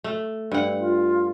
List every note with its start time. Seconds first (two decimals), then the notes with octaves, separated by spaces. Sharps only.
0.04 A3
0.52 G2 F#5
0.80 F4